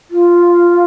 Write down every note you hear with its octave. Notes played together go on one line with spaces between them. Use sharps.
F4